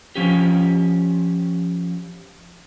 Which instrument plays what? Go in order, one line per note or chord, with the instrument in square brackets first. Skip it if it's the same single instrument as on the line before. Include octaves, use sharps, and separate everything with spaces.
[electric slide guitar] F3 C#4 G4